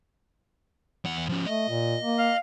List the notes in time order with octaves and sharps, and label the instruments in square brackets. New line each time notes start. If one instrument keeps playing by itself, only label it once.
[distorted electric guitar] E2 F#5
F3 C#4
[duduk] A3 [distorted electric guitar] D#5
[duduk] A#2
A#3
[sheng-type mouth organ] F5